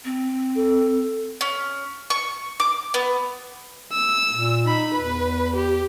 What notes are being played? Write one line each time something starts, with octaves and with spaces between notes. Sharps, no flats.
C4
A4
C#4
C#6
D6
B3
E6
A#2
D#4 B5
E2 B4
G4